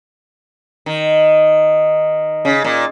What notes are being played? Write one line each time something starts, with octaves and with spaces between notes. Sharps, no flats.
D#3
C#3
A#2